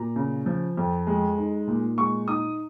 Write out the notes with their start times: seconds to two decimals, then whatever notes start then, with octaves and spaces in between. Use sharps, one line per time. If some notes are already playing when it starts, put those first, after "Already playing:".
Already playing: A#2 A#5
0.16 C#3
0.46 F3
0.77 F2
1.07 G#3
1.38 D#4
1.68 A#2
1.97 G#3 C#6
2.28 D#4 D#6